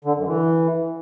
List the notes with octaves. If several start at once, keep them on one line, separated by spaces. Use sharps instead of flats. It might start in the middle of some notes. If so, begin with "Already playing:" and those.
D3
F#2
E3